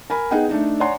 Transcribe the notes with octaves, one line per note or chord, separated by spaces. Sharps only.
A#4 G#5 B5
B3 D#4 G#4 D#5 F#5 G5
A3 D4 D#4
C#5 D5 F#5 G#5 A#5 C6